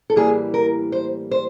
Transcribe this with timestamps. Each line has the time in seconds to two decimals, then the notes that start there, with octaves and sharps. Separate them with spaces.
0.10 A4
0.16 A2 E3 G3 A#3 G#4
0.54 A#4
0.92 C5
1.31 C5